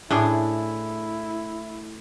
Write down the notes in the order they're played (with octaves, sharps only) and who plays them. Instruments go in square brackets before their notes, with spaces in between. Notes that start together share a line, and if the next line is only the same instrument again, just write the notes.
[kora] A2 D4 G#4 [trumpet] E4